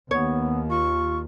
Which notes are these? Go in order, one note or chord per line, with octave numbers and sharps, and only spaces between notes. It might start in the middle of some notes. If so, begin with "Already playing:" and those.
D#2 B3 C#5
F4 C#6